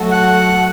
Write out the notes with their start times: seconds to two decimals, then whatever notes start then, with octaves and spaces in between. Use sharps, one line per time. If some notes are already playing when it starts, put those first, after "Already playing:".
Already playing: F#3 A3 F#4 A4
0.12 F#5